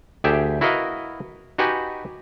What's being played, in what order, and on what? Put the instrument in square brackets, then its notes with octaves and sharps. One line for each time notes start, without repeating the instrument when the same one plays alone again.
[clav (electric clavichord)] D2 G4 G#4 E5 G5
E4 F#4 A#4 B4 D#5 F5
D#4 F#4 G4 B4 G#5